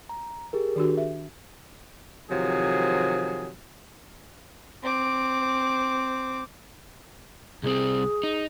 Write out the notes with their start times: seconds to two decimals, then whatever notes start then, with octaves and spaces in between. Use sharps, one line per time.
0.09 A#5
0.53 G4 G#4 A#4
0.76 D#3 D4 F#4
0.97 E5
2.30 C3 D#3 F3 F#3 G#4
4.82 C4 D6
7.63 C2 C4 G#4
8.23 D#4